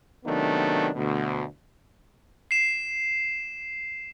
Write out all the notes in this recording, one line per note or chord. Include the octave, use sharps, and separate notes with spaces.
C3 D#3 F#3 A3 B3 D4
D2 B2
C7 E7